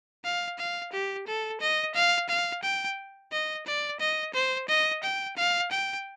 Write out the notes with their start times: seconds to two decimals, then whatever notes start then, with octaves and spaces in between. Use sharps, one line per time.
0.24 F5
0.58 F5
0.92 G4
1.27 A4
1.60 D#5
1.94 F5
2.29 F5
2.62 G5
3.32 D#5
3.66 D5
4.00 D#5
4.33 C5
4.68 D#5
5.03 G5
5.37 F5
5.71 G5